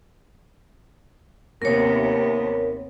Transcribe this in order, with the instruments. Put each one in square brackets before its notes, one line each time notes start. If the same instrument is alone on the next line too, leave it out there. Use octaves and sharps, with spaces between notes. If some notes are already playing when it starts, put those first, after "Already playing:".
[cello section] D#2 C3 B3 [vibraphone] A#4 C#5